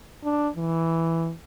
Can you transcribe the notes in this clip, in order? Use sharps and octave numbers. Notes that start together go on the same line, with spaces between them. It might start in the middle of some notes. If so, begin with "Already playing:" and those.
D4
E3